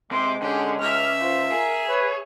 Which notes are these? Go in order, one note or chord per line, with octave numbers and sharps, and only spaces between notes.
C3 G#3 C6 D6
D3 C#4 G4 G#4
C#2 E5 F6
F4 C5
G#4 A#4 G#5
B4 C#5